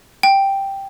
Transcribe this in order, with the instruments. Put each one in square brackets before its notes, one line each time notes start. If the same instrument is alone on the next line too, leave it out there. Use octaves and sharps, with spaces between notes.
[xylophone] G5